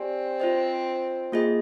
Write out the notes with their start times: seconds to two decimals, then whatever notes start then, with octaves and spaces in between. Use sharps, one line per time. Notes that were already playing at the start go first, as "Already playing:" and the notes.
Already playing: C4 G4 D5 G#5
0.40 F4 C5 D#5
1.32 A#3 F4 G#4 D#5